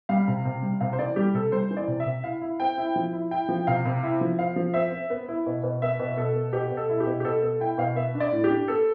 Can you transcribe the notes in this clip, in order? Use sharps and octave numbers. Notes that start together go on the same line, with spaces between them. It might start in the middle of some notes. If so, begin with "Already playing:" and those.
G3 F5
C3
C3
G3
C3 F5
C5
E3 D5
G3 G4
C3 A4
G3 C5
E3
D5
C3
E5
C3
E4 F5
E4
C4 G5
E4
F3
E4
E4 G5
F3
C3 F5
C3
E4
F3
C4 F5
F3
C4 E5
C4
B3
E4
B2
B2
B3 E5
B2
B2 A4
B3
B2 G4
B2
A4
E4
G4
B2
G4
B2 A4
B3 A4
E4 G5
B2 F5
B3 E5
D4
D5
A2
G4
D4
B3 A4